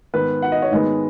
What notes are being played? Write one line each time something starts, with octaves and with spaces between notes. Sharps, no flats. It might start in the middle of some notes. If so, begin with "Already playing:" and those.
G#2 D#3 B3 B4
F#5
D#5
C#5
G#2 D#3 G#3 B3 D#5